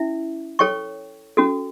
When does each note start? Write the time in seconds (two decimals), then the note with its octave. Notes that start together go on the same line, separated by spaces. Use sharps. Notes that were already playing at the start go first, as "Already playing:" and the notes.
Already playing: C#4 E4 E5
0.59 A4 C#5 G5 C#6
1.37 C#4 F#4 A4